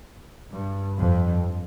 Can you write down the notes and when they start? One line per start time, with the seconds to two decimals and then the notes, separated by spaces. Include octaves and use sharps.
0.51 G2
0.98 F2